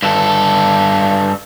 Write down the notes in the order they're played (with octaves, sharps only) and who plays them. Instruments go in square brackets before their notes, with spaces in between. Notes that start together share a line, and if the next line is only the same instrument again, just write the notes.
[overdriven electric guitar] G2 A4